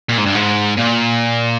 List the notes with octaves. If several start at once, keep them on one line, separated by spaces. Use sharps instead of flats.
A#2
G#2
G2
G#2
A#2